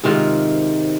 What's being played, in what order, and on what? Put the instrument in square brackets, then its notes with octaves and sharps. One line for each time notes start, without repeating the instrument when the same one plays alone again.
[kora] G#2 C3 D#3 F4